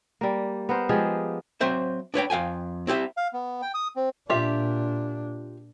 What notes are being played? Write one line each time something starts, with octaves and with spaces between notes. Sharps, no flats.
G3 A#3
B3 A#4 C5
F3 G#3 G4 G#4
F#3 C4 C5 E5
D4 B4 C#5 G5
F2 F5 G5 G#5
C4 E4 G4 E5
F5
B3
G5
D#6
C4
A#2 D4 F4 G4 E5